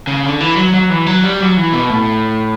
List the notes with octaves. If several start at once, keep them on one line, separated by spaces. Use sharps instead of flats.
C#3
D3
E3
F#3
F#3
E3
F#3
G3
F#3
E3
B2
A2